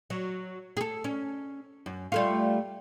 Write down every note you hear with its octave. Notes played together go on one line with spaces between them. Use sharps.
F#3
G#4 A4
C#4
F#2
G3 A3 F4